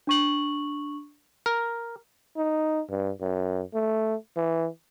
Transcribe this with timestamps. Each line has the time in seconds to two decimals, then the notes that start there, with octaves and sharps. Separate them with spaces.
0.07 D4 C#6 F#7
1.46 A#4
2.37 D#4
2.90 G2
3.21 F#2
3.74 A3
4.37 E3